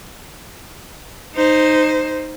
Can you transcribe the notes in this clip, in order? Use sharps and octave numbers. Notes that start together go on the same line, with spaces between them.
D#4 C5